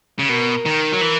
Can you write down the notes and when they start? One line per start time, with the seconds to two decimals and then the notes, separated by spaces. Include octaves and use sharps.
0.19 C#3
0.29 B2 A#4
0.66 D#3
0.92 F#3
1.01 E3